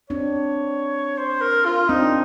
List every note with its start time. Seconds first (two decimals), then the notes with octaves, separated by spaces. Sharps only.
0.10 C4 D4 C#5
1.18 C5
1.41 A#4
1.65 F4
1.89 C4 D4 D#4